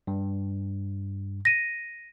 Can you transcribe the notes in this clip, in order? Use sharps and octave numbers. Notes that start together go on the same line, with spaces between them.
G2
A#6 D#7